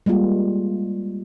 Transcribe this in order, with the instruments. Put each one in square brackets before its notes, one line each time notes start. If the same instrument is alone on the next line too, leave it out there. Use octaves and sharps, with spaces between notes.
[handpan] G3 G#3 A#3 F4